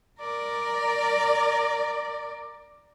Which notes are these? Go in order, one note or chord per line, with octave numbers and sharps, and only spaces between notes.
A#4 D5